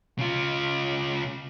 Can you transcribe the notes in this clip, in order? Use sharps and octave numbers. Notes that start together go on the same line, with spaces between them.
C#3 F4